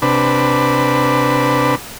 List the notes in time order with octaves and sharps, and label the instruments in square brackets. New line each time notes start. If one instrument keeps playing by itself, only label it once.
[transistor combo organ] C3 D4 B4